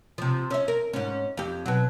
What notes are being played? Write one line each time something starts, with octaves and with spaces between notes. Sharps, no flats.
C3 F3
C#4 E5
A#4
G#2 C#4
F2 G4
B2 F#3